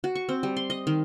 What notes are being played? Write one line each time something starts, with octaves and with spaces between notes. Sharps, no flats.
F#4
C#6
C4
G3
C6
D#5
D#3